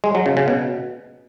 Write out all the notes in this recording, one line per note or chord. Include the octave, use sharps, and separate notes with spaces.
G#3
F#3
C#3
C#3
B2